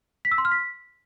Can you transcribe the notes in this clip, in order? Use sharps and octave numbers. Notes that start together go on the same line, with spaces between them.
B6
E6
C6
F6
B6